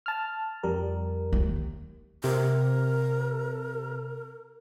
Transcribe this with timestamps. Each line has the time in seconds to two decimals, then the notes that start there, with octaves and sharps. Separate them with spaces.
0.06 A5 F6
0.63 F2 G3 A#4
1.33 D#2
2.24 C3 A#4